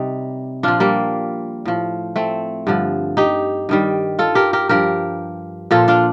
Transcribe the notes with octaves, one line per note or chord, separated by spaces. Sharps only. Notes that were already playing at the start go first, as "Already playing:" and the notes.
Already playing: C3 G3 D#4
A#2 F3 D4 F4
G3 A#3
A2 F3
A3 C4
G2 D3 F3
D#4 G4
G2 D#3 G3
F4 A4
G4 A#4
G4 A#4
G2 F3 G4 A#4
A#2 F3 F4 A4
D4 F4